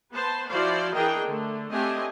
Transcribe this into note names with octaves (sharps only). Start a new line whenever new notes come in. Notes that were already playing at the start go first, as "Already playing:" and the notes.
B3 B4 C5 A5
F3 E4 F#4 C5 D5 F5
E3 D4 G#4 A#4 D#5 G5
D3 A3
A3 C4 D4 G4 D#5 G#5